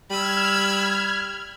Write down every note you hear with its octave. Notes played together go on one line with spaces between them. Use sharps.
G3 B5 E6 F6 G#6